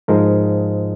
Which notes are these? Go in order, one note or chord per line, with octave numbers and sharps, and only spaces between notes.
G#2 F3 G#3 A#4